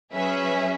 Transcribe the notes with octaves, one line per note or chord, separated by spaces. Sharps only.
F#3 C#4 G#4 B4 E5